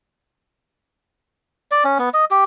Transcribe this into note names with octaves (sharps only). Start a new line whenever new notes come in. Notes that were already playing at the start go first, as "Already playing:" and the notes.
D5
C#4
B3
D#5
G4